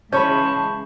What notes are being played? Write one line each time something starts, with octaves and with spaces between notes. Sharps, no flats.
C#3 E3 G#3 C#4 A5 B5 C#6 G6